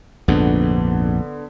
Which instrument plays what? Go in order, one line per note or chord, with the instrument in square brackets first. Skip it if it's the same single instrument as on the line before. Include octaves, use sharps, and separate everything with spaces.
[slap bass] A#1 F2 G#2 [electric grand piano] D3 B3